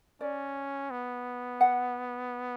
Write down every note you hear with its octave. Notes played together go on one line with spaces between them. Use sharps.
C#4 D5
B3
F#5